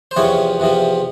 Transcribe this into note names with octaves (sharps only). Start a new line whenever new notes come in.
C5
E2 C3 F3 C#5
E2 C3 F3